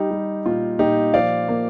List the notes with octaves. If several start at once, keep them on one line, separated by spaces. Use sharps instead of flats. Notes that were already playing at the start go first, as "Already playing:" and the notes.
Already playing: G3 D#4 G4
G3
A#2 F4
A#2 D#4 G4
F3 D5 F5
A#3